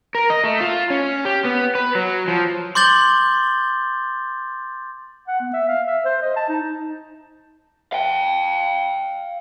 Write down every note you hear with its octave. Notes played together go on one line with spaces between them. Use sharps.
A#4
D#5
A3
F4
C#4
G4
B3
B4
F#3
F3
C6 D6 G6 A6 F#7 G7
F#5
B3
E5
F5
E5
C5
D#5
A5
D#4
F5 G5